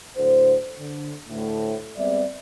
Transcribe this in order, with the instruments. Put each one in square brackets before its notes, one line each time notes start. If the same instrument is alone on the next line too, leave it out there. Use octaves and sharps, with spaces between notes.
[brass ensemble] A2 D3 F#3 C5
D3
D2 A2
G3 G#3 B3 C4 D5 E5